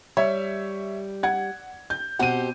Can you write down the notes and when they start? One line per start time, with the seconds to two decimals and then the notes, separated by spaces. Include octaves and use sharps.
0.17 G3 C#5 E5
1.23 F#5 G#6
1.90 G6
2.19 B2 C4 G4 F#5 D#7